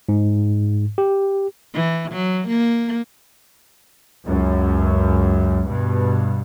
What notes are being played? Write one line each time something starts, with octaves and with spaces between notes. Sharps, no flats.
G#2
G4
E3
F#3
A#3
C#2 F#2
G2 B2